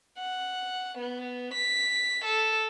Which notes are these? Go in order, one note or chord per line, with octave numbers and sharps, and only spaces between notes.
F#5
B3
B6
A4